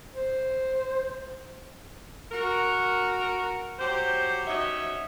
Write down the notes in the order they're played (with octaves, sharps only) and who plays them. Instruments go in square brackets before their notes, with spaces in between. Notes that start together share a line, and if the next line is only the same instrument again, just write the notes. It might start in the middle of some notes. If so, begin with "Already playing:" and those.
[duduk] C5
[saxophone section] F#4 A#4
F#3 G4 C5
C#4 D#4 F#4 E5